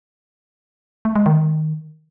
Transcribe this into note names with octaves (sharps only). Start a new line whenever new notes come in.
A3
G#3
D#3